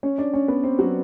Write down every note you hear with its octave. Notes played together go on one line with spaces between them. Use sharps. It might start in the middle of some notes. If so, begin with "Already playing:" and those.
C#4 C#5
D4 D5
C#4 C#5
B3 B4
C4 C5
F#3 F#4